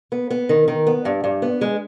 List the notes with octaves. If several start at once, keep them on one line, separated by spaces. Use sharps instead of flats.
B3
B3
D#3
D#3
B3
G2
G2
B3
G#3